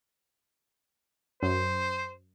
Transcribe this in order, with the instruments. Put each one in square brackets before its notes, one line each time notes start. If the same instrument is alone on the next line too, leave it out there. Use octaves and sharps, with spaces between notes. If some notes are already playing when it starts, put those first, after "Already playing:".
[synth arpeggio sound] F#2 [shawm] C5